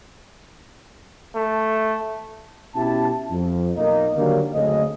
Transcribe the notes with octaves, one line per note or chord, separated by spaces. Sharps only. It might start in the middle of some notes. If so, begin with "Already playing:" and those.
A3
B2 C#4 E4 G4 A5
F2
B1 A#3 D#4
D3 D#3 F#3 G3 A#3
F#1 D2 C#3 C4 A4 D#5